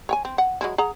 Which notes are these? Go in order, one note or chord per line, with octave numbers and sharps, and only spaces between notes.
C#5 G5 G#5
C4
F#5
F#3 G#3 E4
G#4 F#5 A#5